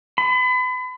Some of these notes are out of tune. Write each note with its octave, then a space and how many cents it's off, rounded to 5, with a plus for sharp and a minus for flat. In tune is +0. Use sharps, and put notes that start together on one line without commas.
B5 +35